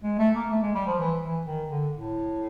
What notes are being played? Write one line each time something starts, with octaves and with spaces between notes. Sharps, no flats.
G#3
A3
A#3
A3
G#3
G3
F3
E3
E3
D#3
D3
A2